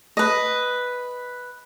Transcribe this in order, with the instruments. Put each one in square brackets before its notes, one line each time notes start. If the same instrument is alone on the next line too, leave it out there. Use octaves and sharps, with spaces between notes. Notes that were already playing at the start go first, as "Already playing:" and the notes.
[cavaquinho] B4 D#5